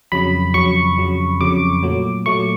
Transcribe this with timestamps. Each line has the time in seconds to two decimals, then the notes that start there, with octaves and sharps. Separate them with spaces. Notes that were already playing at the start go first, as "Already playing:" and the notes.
0.12 F2 C#3 F#3 B5
0.54 F2 C#3 F#3 C#6
0.98 F2 C#3 F#3
1.41 F2 C#3 F#3 D6
1.83 A#2 F#3 A3
2.26 A#2 F#3 A3 C#6